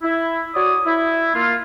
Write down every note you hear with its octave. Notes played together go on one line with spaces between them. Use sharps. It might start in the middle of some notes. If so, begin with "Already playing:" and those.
E4
F#4 C#5 D5 D6 D#6
E4
A#3 F4